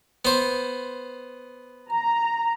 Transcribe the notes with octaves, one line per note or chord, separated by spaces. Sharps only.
B3 C5
A#5